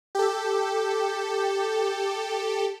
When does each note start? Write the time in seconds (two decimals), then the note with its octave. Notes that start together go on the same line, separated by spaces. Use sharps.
0.15 G4 A4